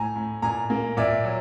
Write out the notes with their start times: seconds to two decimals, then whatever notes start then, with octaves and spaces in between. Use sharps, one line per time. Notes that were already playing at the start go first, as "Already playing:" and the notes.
Already playing: A2 G#5 A#5
0.16 A2
0.42 A#2 G#5 A#5
0.70 A#3
0.97 A#2 D5 E5
1.24 F#3